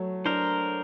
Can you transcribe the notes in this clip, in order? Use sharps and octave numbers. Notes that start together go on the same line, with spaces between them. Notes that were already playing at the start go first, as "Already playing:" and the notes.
Already playing: F#3 A3
D4 A#4 C5